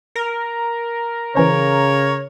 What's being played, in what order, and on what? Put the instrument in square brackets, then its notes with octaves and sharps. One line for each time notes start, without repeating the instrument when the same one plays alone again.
[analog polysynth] A#4
[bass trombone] C#3 [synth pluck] E3 C#4 C5 [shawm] C#5